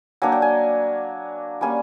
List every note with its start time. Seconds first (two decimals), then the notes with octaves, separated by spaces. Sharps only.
0.22 F#3 A#3 D4 G#5
0.32 G5
0.42 G#5
1.61 G3 A#3 C#4 G#5